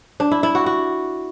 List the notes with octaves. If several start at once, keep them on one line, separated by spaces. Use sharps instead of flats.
D4
E4
E4
F#4
F#4